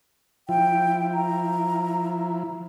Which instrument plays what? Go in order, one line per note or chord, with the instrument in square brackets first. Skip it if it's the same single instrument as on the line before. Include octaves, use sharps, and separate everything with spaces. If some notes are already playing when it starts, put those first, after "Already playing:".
[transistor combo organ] F3 E4 [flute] G5
[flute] A#5